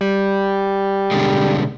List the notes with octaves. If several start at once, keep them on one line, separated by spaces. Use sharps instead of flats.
G3
B2 D3 G#3